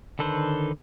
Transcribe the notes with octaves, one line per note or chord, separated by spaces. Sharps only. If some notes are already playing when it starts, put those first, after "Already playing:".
D3 D#3 A4 B4 C5